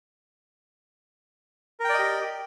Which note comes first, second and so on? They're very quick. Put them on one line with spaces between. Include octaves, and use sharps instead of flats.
A#4 G5 D5 D#5 G4